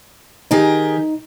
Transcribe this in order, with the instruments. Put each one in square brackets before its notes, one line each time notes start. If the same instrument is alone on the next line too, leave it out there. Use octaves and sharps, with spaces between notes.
[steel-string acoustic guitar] D#3 G4 G#4 [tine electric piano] D#4